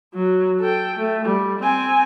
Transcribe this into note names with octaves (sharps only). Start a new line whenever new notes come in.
F#3
A4 G5
A3
G3
C4 G#5